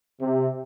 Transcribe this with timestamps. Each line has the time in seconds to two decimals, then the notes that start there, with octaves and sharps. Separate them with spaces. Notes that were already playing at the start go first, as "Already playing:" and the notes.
0.20 C3